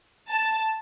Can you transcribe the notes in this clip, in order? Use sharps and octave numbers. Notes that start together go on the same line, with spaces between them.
A5